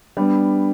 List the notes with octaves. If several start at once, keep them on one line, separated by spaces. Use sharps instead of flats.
G3 B3 D4